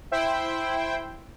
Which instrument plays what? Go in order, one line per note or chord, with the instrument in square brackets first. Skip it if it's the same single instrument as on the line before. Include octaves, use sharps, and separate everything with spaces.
[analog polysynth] E4 C5 G5